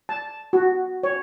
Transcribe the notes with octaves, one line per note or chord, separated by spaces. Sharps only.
A5
F#4
C#5